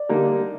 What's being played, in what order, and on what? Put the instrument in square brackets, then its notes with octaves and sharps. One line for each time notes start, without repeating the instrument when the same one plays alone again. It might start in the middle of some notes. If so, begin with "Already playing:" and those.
Already playing: [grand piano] D5
[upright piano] D3 G3 A#3 D#4